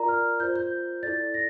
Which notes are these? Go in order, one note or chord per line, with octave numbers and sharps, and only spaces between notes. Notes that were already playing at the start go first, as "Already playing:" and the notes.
Already playing: F4 A#4 D5 A#5
F6
F4 C5 G6
G6
E4 A4 D5 A6
A#6